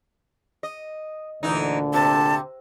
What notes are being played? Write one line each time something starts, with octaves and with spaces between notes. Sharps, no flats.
D#5
D2 A#2 D3 E3 D#4
C3 A5